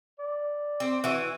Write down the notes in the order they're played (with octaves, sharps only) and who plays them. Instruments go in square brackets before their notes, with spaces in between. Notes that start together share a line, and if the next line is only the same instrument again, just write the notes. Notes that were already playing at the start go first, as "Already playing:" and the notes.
[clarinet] D5
[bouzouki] C4
E3 F#4